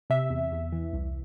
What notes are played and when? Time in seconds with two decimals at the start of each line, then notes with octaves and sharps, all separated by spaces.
0.10 C3 E5
0.30 E2
0.52 E2
0.72 E3
0.93 C2